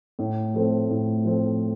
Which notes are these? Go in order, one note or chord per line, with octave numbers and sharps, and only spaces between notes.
A2
F3 A3 C4
A2
F3 A3 C4